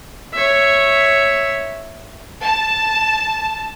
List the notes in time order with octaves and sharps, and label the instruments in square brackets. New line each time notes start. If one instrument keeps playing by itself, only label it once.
[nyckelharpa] C#5 E5
[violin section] A5